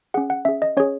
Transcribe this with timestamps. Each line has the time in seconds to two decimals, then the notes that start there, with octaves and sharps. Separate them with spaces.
0.14 C#4 G#4 F#5
0.30 F#5
0.45 C#4 G#4 E5
0.62 D#5
0.77 C#4 G#4 C#5